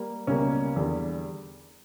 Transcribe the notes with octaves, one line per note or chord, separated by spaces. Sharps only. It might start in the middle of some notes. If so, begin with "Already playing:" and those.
Already playing: G3 A#3
C#2 B2 G3 A#3 C#4
E2 D3 G3